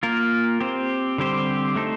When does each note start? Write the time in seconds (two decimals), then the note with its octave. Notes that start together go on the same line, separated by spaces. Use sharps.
0.03 A#3 F4 A#4
0.60 C4 G4 C5
1.18 D3 G3 C4 G4 C5
1.76 A3 D#4 A4 C5